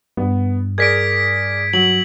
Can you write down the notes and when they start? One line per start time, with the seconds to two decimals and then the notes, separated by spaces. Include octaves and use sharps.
0.17 G2 B3
0.78 G#4 A#4 D5 G#6 B6 D7
1.73 F#3 F#7